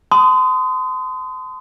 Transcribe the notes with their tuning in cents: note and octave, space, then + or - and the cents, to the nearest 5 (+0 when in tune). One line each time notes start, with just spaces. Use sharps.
A5 +0 C6 -35 D#6 +0